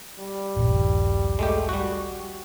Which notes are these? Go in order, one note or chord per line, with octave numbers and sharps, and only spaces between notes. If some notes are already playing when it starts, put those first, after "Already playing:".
G3
D#1 A#1 G2
G#3 A3 G4
G3 F#4